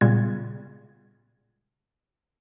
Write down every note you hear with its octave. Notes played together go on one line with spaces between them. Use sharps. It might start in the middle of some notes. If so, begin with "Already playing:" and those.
A#2 C#3 G3 G#3 B3 G#6